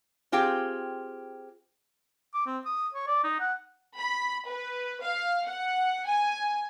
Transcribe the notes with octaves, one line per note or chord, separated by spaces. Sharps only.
C4 F4 G4 G#4 G5
D6
C4
D#6
C#5
D5
D#4
F#5
B5
B4
F5
F#5
G#5